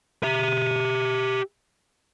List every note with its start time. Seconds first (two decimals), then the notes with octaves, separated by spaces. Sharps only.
0.23 G4 E5